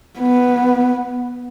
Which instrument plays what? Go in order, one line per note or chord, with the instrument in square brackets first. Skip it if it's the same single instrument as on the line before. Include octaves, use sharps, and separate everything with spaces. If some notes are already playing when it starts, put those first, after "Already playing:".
[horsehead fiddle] B3